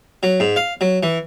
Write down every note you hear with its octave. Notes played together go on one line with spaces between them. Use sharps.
F#3
G#2
F5
F#3
E3